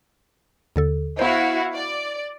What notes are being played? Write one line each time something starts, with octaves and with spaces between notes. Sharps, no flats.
D#2 D3 A4
B3 E4 F#4 C5 F5
D5